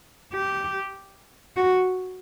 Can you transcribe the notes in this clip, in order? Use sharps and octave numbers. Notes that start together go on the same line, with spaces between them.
G4
F#4